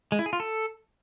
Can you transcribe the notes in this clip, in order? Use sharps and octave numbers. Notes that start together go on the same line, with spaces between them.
G#3
E4
G#4
F4
A4